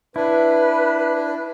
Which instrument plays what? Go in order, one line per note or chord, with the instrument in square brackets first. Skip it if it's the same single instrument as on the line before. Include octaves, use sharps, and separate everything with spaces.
[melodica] D4 [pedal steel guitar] E4 [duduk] B4